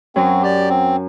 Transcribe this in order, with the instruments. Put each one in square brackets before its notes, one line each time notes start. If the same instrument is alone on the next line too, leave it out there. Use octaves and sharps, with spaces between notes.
[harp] F#2 F#3 [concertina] C4
[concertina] G4 D5
C4